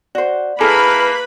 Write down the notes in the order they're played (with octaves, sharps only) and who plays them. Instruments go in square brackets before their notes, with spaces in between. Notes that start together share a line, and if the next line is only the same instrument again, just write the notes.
[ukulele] F#4 C5 [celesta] D5
[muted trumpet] A#3 [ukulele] E4 G#4 A4 [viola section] B4 B5 [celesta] A#5 F6